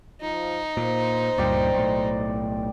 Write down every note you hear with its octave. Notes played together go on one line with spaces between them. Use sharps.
F3 D#4
A#2 C5
C#2 G2 A#2 D5 G5
B1 A2